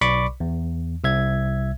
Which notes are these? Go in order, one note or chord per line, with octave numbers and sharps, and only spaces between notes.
B1 D5 B5 C#6 D6
E2
C2 E5 G#6